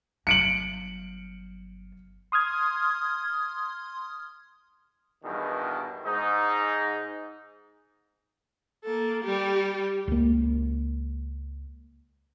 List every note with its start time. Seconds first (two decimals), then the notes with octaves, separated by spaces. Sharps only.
0.27 G1 F#3 C#7 D7 F#7
2.32 C6 D#6 F6 G#6
5.24 E2 G2 B2 D#3
6.05 G#2 D#4
8.84 A#3 A4
9.23 G3 G4
10.08 C#2 A#3